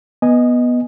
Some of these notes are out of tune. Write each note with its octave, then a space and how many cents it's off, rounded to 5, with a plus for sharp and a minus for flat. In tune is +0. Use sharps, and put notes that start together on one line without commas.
B3 -10 D#5 +0 G#5 +0